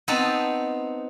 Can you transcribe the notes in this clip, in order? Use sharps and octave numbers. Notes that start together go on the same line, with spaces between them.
B3 C4 D#4 A5